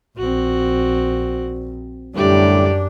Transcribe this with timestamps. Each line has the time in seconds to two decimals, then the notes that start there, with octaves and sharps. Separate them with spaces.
0.18 A#1 C4 F#4
2.15 F#2 A2 D3 G3 D4 G4 D5